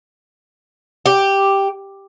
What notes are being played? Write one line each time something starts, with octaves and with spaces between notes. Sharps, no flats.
G4